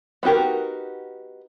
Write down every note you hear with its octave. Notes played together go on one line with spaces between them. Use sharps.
B3 D#4 F#4 G4 A#4